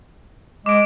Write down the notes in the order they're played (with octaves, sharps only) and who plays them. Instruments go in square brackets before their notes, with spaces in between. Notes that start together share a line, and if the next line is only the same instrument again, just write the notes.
[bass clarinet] G#3 [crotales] D6 D7